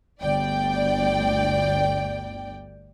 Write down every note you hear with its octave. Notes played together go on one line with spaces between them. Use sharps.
G1 D2 D5 G5